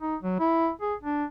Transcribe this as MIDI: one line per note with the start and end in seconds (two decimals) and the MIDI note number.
0.01 0.16 63
0.23 0.36 54
0.40 0.70 64
0.81 0.95 68
1.03 1.25 62